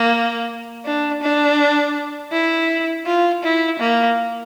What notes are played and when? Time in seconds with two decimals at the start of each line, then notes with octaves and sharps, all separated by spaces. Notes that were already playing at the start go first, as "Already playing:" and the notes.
Already playing: A#3
0.86 D4
1.22 D4
2.32 E4
3.06 F4
3.43 E4
3.80 A#3